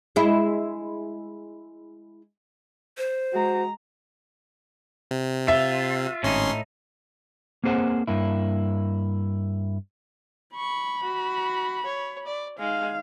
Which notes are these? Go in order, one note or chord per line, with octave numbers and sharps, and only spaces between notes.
G#3 E4
C5
G#3 F#4 A#5
C3
F4 E5
G#1 A2 C#4 D#4 C6
A#3 C4 G#4 C5 F#5
G2 A#3 E4
B5 C#6
F#4
C#5
D5
G#3 D#4 F5